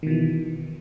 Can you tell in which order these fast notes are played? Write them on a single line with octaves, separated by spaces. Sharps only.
D#3 B2 E3